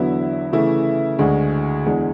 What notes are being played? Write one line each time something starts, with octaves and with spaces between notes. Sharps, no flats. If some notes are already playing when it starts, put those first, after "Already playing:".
Already playing: E2 D3 F#3 B3 E4
C#3 E3 A3 E4
D2 D3 G#3
E2 D3 G#3